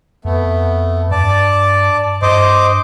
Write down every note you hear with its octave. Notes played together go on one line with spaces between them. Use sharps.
F2 A3 B3
G2 D5 A5
G2 C5 D#5 D6